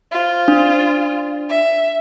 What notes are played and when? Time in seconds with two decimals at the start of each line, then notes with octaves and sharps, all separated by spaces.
0.11 F4 C5
0.48 D4
1.49 E5